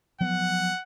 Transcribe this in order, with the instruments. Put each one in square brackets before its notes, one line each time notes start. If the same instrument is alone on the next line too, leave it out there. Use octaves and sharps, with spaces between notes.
[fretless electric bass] F3 F#3 B3 [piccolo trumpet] F#5